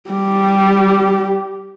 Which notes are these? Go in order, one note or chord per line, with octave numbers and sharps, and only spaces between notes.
G3 G4